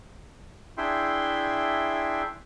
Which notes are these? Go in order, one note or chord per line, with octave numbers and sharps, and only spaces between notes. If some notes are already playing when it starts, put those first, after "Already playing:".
D4 E4 G#4 E5 G5 C6